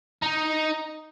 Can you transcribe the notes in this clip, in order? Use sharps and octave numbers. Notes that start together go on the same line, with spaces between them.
D#4